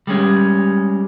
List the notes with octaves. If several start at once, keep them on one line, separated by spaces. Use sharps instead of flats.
G3 G#3 C#4